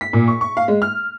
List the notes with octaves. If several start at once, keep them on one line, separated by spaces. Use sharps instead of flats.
B6
A#2
C#6
C#6
F5
G#3
F6